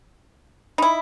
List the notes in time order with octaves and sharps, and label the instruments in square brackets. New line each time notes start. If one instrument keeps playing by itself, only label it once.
[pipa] D#4 E4 [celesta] B5